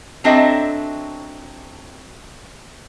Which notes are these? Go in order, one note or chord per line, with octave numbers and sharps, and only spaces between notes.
F#3 C4 D4 A4 D#5 E5